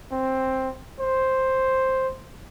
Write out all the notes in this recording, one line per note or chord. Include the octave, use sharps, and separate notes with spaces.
C4
C5